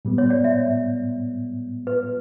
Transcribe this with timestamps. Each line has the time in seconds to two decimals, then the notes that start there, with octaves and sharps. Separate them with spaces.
0.05 A2 G3 B3
0.18 C#5
0.30 D5
0.44 E5
1.87 B4